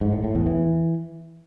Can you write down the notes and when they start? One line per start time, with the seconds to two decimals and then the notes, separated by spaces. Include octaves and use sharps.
0.01 G#2
0.13 A2
0.24 A2
0.35 E2
0.46 E3